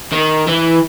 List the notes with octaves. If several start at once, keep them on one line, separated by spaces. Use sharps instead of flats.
D#3
E3